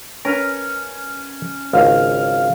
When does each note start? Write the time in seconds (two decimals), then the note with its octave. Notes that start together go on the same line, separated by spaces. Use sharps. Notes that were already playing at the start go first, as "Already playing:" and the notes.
0.25 C#4 A#4 B4 A#5
1.73 G#1 C#2 F5